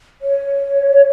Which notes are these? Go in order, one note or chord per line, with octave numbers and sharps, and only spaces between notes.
C#5